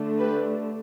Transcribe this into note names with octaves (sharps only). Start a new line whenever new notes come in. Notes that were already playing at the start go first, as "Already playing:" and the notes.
Already playing: D3 A3 D4
G4 B4